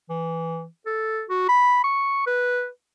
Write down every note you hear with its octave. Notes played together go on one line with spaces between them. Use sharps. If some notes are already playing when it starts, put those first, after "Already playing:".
E3
A4
F#4
B5
C#6
B4